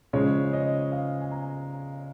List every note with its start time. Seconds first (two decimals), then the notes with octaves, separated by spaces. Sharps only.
0.13 C#3 F3 G#3 C#5
0.53 D#5
0.92 F5
1.21 G#5
1.32 A#5